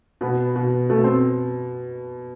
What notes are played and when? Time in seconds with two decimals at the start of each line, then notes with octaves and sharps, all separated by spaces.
0.21 B2 B3
0.56 B2
0.89 B2 A3
1.04 C4